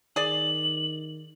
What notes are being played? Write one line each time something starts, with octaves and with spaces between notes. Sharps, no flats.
D#3 G#4 D5 F#7